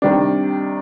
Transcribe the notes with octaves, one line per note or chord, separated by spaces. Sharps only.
C3 D#3 G3 D4